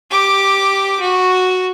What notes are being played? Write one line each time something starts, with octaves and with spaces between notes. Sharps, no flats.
G4 D6
F#4